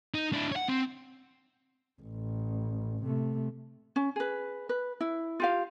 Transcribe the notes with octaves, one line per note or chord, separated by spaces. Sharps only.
D#4
D4 E4
C#5 F#5
C4
A1
C3 A3
C#4
G#4 B4
B4
E4
F4 G4 F5